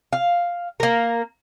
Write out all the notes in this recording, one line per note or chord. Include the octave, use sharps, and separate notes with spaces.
F5
A#3 A#4